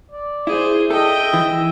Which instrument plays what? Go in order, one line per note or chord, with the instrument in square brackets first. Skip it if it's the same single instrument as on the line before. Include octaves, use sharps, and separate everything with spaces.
[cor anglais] D5
[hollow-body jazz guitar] E4 [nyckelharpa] G#4 C5
[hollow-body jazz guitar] A4 [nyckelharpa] D#5 G5 [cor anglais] E5
[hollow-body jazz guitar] E3